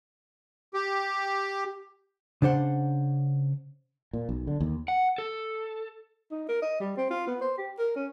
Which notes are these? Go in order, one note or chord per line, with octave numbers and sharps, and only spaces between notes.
G4
C#3 D4 C5 F#5
A#2
B1
D3
D#2
F#5
A4
D#4
A#4
D#5
G3
C4
F4
B3
C5
G4
A#4
C#4